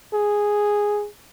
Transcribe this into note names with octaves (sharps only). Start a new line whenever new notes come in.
G#4